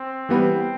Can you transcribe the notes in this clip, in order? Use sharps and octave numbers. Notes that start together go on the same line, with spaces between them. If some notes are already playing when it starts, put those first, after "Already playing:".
Already playing: C4
E3 G3 B3